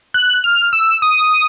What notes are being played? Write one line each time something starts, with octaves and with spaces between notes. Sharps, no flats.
F#6
F6
E6
D#6